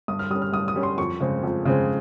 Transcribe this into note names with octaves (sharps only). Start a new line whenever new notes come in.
G2 D#6
F6
G3 C#4 D#6
F6
G2 D#6
D#6
G3 C#4
C6
F2 C#6
C#3 G#3 C4
F2
C#3 G#3 C4